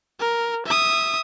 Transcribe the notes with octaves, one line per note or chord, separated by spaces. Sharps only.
A#4
E5 D#6